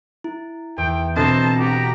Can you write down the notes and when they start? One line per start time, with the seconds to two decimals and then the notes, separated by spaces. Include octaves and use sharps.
0.24 E4
0.78 E2 G5
1.16 B2 C4 D4 A4 C5 D#5 A5 A#5
1.59 F#4 G4 A#5